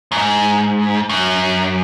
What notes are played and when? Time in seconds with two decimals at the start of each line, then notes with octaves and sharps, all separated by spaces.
0.12 F#2
0.18 G#2
1.09 F#2